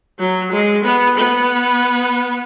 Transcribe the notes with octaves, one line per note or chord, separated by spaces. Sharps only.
F#3
G#3
B3
B3